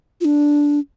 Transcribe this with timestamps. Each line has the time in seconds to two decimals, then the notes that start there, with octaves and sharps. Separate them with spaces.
0.21 F4
0.25 D4